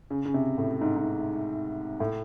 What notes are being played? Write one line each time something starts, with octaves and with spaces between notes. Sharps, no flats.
C#3
C#3
C3
A2
G#2
G#2
A2